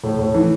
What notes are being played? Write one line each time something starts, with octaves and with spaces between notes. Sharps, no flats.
A2
A2
E3